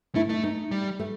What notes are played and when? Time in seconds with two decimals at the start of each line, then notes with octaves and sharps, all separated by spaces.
0.15 A3 E4
0.29 A3 D#4
0.44 D#4
0.71 G3
0.99 A3